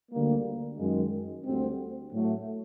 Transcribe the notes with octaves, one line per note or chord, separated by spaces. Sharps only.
D2 D3 G3 A#3
F#2 D#3 G#3
D2 D3 G3 C4
A2 F#3 A3